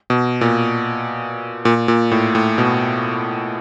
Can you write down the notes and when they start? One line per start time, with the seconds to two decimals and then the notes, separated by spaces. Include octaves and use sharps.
0.10 B2
0.41 A#2
1.65 A#2
1.88 A#2
2.11 A2
2.35 A2
2.58 B2